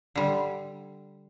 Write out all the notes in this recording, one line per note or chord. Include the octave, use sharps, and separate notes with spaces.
D3 G3